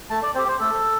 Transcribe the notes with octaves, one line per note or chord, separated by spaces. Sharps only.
A3 A5
D5
C4 G4 C5
C5
A3 A4